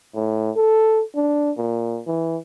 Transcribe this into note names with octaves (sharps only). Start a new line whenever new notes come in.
A2
A4
D4
A#2
E3